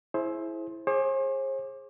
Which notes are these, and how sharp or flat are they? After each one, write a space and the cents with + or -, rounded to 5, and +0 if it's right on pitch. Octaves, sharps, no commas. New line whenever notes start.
E4 +0 G#4 +35 C5 +20
G#4 -5 C5 +45 D6 +5